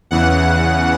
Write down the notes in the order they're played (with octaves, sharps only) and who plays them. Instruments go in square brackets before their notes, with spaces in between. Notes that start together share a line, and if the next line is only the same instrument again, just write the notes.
[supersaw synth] E2 C#3 E3 F#5